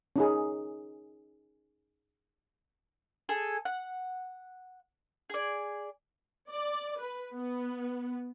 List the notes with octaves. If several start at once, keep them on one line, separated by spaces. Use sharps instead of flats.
C#4 D#4 G#4
G#4 A4 G#5
F#5
G#4 D5
D5
B4
B3